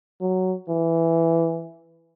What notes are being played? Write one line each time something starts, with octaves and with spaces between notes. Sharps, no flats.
F#3
E3